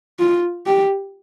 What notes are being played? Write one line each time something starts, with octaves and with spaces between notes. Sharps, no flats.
F4
G4